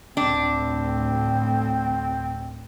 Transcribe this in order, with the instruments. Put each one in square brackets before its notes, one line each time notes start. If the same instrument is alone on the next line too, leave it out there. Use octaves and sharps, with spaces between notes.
[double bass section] D2 A2 [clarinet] C4 [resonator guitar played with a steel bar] D4